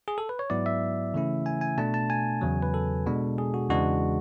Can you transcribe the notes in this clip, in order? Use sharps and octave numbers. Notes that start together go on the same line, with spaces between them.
G#4
A4
B4
C#5
G#2 F#3 B3 E4 D5
E5
C#3 E3 A3 C#4 E4
G#5
G#5
B2 A3 D4 A5
A5
G#5
E2 C#3 F#3
B4
A4
B2 G#3 D4
G#4
F#4
E2 C#3 E3 G#3 D4 F#4